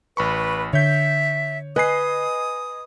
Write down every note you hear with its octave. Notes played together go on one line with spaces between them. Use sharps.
A1 B4 B5 C#6
D3 C#5 E5 G6
B4 D#5 G#5 D#6 C7